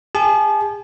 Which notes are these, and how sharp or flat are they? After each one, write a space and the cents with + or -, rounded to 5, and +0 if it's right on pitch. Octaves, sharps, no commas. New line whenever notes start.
G#4 -40 A5 -40